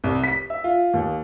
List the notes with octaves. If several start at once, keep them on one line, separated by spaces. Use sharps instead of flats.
C2
B6
E5
F4
D#2